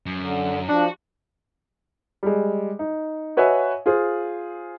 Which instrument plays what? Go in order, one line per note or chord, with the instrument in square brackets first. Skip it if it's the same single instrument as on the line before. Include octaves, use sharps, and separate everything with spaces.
[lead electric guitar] F#2
[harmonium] D3
[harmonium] F3 [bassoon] D4 [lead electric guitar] F#4
[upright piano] G3 G#3
D#4
F#4 B4 C#5 D#5 E5 G#5
F4 G#4 C5